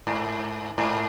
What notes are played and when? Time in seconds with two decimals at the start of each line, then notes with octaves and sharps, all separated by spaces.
0.07 G#2
0.78 G#2